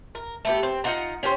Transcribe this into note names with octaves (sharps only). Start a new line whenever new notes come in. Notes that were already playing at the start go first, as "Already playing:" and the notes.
A#4
A3 B3 G4
C4
D#4 F4 F#5 A#5
C#4 G4 A#4 C5